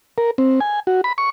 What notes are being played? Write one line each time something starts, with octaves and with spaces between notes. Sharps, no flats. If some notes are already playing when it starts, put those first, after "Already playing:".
A#4
C4
G#5
F#4
B5
C#6